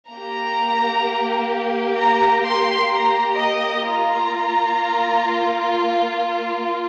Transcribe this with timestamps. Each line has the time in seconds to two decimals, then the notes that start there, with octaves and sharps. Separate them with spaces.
0.10 A#3 G4 A#5
1.97 A#5
2.44 C6
2.91 A#5
3.38 D#5
3.84 A#3 F4 A#5